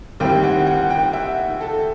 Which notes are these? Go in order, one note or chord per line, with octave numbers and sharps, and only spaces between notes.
D#2 D#3 G3 C4 E4 G5
F#5
F#5
G5
E5
A4